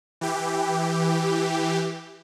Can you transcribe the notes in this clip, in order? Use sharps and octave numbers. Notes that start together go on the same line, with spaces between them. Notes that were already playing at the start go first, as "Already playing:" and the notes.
E3 G4